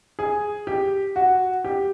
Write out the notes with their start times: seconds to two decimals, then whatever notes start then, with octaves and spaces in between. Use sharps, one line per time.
0.19 G#4
0.67 G4
1.16 F#4
1.65 G4